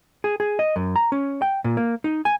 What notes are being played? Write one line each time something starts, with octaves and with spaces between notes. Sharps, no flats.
G#4
G#4
D#5
F#2
A#5
C#4
G5
A#2
A#3
D#4
G#5